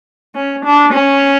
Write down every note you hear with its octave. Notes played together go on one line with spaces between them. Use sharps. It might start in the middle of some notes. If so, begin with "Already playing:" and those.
C#4
D4
C#4